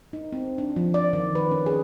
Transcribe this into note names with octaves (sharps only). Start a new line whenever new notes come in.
D#4
C4
D4
F3
D5
D#3
B4
C#4
G#4